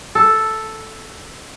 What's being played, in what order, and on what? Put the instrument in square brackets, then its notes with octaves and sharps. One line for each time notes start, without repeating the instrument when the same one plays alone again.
[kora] A4